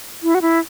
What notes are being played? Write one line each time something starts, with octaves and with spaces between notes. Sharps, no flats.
E4
F#4
E4